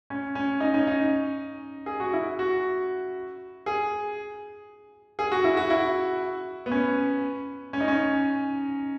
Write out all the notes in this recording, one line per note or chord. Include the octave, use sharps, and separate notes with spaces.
C#4
C#4
D#4
C#4
D#4
G#4
F#4
E4
F#4
G#4
G#4
F#4
E4
F#4
E4
B3
C#4
C#4
D#4
C#4